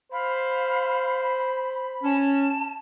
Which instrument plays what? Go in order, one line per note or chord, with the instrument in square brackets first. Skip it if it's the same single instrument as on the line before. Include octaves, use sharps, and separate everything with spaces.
[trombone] C5 [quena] F5 [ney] B5
[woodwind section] C#4 [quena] A5